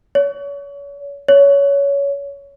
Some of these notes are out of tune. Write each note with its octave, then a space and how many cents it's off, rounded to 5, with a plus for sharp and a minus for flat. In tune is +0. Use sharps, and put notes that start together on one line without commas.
C#5 +35
C#5 +20